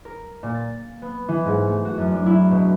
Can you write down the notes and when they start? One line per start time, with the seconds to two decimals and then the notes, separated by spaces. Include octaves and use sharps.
0.05 A#4
0.43 A#2
0.54 A6
1.02 B3
1.28 E3
1.46 G#2
1.66 A3
1.85 F#4
1.98 F#2
2.12 D4
2.26 E4
2.51 B2